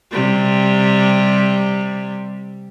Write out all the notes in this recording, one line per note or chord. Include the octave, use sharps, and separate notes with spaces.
C3 G3